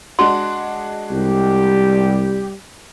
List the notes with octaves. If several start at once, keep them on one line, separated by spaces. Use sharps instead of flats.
G#3 D4 F#4 C6
C2 G3 G4